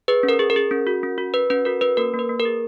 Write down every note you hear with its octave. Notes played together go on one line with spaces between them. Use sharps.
G#4 B4
C#4
A#4
G#4
A#4
G#4
C#4
F#4
C#4
F#4
F#4 B4
C#4 B4
F#4 A#4
C#4 B4
A#3 A#4
A#3
B4
A#3
A#4
G#4